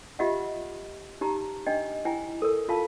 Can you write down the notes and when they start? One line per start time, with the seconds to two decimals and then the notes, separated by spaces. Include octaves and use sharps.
0.19 F4 G4 D#5 E5 F#5
1.21 D#4 G4 A#5
1.66 D4 D#5 G5
2.05 E4 G5 G#5
2.42 A4 A#4
2.69 F4 F5 A5